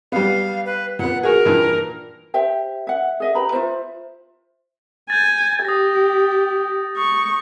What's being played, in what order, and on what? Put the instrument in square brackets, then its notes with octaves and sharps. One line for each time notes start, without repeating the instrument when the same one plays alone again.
[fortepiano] G3 B3 [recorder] F5
[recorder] B4
[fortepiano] A#2 B3 [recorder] F#5
[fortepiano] F#4 G#4 [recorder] A#4
[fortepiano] G2 A#2 E3
[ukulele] G4 C5 E5 G5
E5 F#5
G#4 D#5 E5
G4 B4 A#5 B5
F4 A#4 C5 E5
[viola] G#5 [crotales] G6 A6
[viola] G4 [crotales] D#6 A#6
[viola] C#6 [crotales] D#6